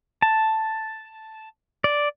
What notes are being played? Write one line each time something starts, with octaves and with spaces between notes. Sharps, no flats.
A5
D5